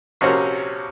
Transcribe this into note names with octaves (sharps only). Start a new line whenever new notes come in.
A#1 C3 C#4 F#4 A#4 C5